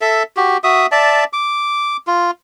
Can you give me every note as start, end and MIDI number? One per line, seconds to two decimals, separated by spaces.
0.01 0.23 69
0.01 0.23 76
0.37 0.57 66
0.37 0.57 67
0.64 0.87 66
0.64 0.87 76
0.64 0.87 87
0.92 1.24 74
0.92 1.24 76
0.92 1.24 81
1.33 1.97 86
2.07 2.31 65